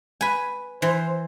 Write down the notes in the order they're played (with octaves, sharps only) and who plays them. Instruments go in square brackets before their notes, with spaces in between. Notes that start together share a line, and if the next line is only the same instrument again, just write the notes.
[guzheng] B4 G#5
[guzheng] E3 [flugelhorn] C5